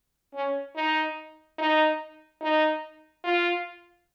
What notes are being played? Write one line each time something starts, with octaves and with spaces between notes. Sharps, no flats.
C#4
D#4
D#4
D#4
F4